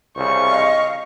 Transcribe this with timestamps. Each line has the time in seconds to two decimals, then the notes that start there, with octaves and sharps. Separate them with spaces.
0.17 C2 C#3 C5 C#6
0.50 D#5 F5